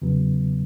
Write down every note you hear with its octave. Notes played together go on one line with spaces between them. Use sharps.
E2 C#3 F#3 B3